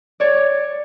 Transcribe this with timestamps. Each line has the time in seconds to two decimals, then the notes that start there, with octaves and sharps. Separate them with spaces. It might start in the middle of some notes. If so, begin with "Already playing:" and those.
0.20 C#5 D5